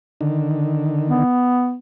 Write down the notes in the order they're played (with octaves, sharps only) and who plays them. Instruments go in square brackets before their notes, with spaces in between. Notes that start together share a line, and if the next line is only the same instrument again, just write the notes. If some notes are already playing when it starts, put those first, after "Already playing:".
[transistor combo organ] D3 D#3
[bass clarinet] B3